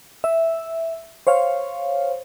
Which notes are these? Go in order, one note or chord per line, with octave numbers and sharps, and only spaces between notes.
E5
C5 C#5 F5